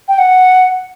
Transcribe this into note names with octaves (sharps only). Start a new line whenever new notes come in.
G5
F#5